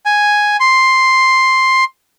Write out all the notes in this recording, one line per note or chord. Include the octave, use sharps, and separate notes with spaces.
G#5
C6